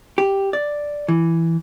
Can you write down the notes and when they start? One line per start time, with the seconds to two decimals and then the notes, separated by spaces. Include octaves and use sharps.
0.18 G4
0.53 D5
1.08 E3